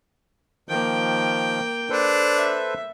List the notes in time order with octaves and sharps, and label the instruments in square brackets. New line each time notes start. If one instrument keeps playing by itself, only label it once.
[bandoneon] D#3 F3 [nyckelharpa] A#3 G5
[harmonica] D4 [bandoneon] A4 B4 C5
[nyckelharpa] E5